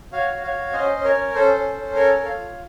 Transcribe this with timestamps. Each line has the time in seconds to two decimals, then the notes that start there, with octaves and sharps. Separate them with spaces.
0.12 F#4 C#5 F5
0.32 F#4
0.43 C#5 F5
0.53 F#4
0.73 C#4 C5 D#5
0.94 C#4
1.04 A#4 C#5
1.15 C#4
1.34 C#4 A4 C5
1.54 C#4
1.75 C#4
1.95 A4 A#4 C#5
2.16 A4
2.25 C#5 F5
2.36 F4